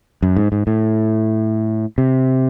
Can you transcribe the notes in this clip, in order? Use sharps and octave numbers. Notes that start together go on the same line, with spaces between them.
F#2
G#2
G#2
A2
C3